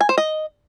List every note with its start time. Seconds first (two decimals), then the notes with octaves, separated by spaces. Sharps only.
0.01 G#5
0.09 C5
0.18 D#5